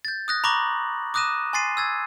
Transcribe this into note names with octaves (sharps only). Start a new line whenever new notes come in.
G6 A6
D#6 F#6 A#6
A#5 B5 C#6 D6 A#6 F#7
D6 D#6 F#6 A#6 D#7 E7
G#5 C6 A6 C7 D#7
E6 G#6 A6